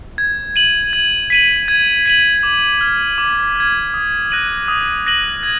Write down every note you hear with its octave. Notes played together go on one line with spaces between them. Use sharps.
G#6
D#7 F#7
G#6
B6 D#7 F#7
G#6
B6 D#7 F#7
D6
F6 G#6
D6
F6 G#6
D#6
F#6 A#6 D#7 F#7
D#6
F#6 A#6 D#7 F#7
G#6